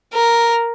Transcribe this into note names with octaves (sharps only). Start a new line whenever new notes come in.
A#4